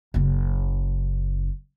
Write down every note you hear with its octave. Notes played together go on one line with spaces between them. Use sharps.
F#1 C#3